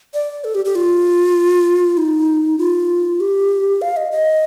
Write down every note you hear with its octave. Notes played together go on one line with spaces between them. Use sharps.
D5
A4
G4
G4
F4
D#4
F4
G4
F5
D#5
D#5